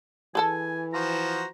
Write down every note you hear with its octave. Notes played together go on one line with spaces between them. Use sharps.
E3 G#4 A4 G#5 A5
F3 F#4 C5 A#5